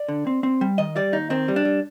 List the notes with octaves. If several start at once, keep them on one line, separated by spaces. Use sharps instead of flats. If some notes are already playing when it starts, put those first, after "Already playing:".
Already playing: D5
D3
C4
C4
G3
D#3 D#5
G3 D5
D#2 D#4
D#3 C4
G3
D4
G3